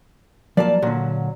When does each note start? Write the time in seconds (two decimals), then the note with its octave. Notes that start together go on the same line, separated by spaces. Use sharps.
0.57 F3 F#3 A#3 D5 A5
0.82 A#2 D3 F#3